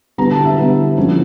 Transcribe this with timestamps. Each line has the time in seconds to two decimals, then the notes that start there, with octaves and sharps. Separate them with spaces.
0.18 D3 G3 B3 E4 A#5
0.31 A5
0.45 E5
0.58 D3 G3 B3 E4
0.97 D3 F3 A#3 C#4 E4